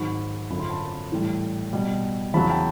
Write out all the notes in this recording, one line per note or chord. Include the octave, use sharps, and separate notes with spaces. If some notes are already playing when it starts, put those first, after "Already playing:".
Already playing: G#2 D#3 F#3 B5 C#6
F#2 D3 F3 B5
C6
A5 B5
A2 E3 G3
B2 G3
E2 C#3 F#3 A5 B5
G5 A5